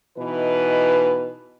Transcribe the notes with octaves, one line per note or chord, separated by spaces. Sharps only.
B2 E3 D#4 B4